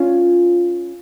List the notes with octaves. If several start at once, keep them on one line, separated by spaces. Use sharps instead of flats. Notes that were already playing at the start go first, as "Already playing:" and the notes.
Already playing: C#4 F4